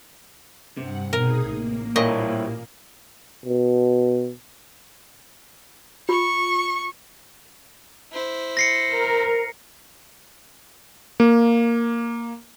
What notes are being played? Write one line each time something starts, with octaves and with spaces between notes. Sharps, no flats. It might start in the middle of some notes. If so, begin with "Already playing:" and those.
G2 C3 F#5
B2 D#4 G#4 A#4 D#6
A1 A#3
A#2 G3 E4 C#5 D#5
B2
F4 C#6
E4 C5
A#6 C7 C#7
A#4
A#3